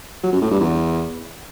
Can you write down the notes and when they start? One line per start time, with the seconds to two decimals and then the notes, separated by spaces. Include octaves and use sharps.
0.23 F#3
0.32 F#2
0.42 A2
0.51 G2
0.60 E2